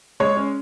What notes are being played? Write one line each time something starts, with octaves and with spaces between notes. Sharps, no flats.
G#3 C#5
C#4